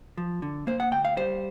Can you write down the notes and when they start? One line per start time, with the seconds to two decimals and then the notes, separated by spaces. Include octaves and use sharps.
0.17 F3
0.42 D3
0.67 A#3 C5
0.80 F#5
0.91 D2 G5
1.05 F5
1.17 G3 C5